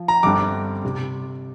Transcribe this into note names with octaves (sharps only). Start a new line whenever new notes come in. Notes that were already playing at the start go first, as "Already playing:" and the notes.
Already playing: F3
A#5
G1 G2 D3 G3 C4 D6
C3